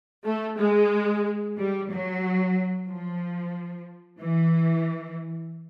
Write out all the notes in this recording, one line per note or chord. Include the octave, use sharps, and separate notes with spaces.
A3
G#3
G3
F#3
F3
E3